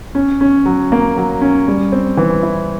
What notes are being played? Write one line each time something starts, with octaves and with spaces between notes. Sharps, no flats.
C#4
C#4
F#3
A#3
F#3
C#4
G3
C4
E3
E4